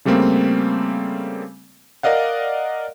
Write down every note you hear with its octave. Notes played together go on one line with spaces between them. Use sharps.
C#3 G3 A3 A#3 C4
A#4 D5 D#5 F5 F#5